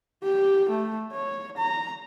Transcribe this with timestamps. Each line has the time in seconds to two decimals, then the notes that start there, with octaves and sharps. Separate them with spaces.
0.23 G4
0.69 A3
1.12 C#5
1.57 A#5